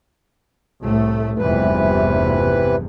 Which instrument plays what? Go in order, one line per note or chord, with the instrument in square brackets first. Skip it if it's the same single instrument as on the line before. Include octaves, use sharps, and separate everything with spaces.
[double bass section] C2 A2 A3
[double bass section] F1 E2 G2 [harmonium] C3 E3 B4